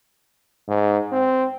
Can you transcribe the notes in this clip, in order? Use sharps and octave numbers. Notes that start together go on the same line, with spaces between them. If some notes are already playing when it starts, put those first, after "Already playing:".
G#2
C4